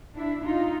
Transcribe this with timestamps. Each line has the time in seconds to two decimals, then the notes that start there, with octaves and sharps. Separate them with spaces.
0.16 D4 E4
0.44 D#4 F4